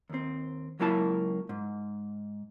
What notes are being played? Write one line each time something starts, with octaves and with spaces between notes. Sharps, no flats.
D#2 C4
C#2 F#3 A#3 E4 F#5 A5
G#2